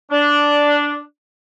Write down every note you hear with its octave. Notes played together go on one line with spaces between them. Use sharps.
D4